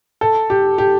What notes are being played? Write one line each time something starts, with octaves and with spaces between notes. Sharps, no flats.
A4
G4
G4